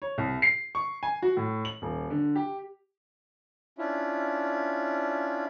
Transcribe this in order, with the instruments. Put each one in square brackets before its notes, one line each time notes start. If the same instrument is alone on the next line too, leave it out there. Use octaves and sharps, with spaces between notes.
[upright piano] C#5
C2
C7
C#6
G#5
F#4
A2
F#7
D#1
D3
G4
[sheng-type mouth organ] C#4 D4 E4 F4